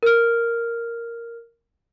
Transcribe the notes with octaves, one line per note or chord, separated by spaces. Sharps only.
A#4 F6